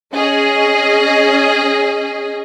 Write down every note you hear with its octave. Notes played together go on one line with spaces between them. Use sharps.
C#4 G#4 D#5